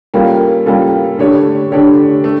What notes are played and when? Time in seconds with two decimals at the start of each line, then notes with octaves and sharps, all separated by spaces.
0.14 G3 A#3 C#4 F4 A4
0.66 G3 A#3 C#4 F4 A4
1.19 D3 A3 D4 G4 C#5
1.72 D3 A3 D4 G4 C#5
2.24 A3